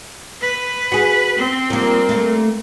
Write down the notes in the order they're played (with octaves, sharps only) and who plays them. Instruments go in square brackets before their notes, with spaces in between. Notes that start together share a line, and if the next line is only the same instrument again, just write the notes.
[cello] B4
[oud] F#4 G#4
[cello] C4
[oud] F3 A#3 [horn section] G3 D4 A#4
[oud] A3 A#3